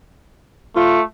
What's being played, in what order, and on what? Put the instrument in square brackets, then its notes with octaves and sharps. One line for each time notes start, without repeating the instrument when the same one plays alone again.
[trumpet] A3 [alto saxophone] F4